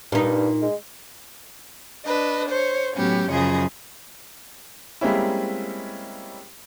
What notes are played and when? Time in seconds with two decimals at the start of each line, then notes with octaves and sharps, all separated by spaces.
0.12 G2 A#2 D#4
0.62 G#3
2.06 D4 B4 D#5
2.48 C5 C#5
2.96 A2 F#3 B3 C#4 G4
3.30 F#2 C#3 F3 G#4 D#5
5.01 G3 G#3 A#3 C4 C#4 E4